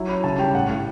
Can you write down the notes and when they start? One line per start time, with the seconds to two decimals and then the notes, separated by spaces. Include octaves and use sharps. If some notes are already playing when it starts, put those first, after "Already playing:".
Already playing: F#3 E4
0.09 C#4 B5
0.24 C#3 A5
0.38 G3 G5
0.55 A2 F#5
0.69 A2